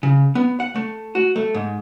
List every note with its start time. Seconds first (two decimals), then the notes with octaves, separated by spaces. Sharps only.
0.03 C#3
0.35 B3
0.60 F#5
0.76 A3
1.15 F#4
1.36 A3
1.55 G#2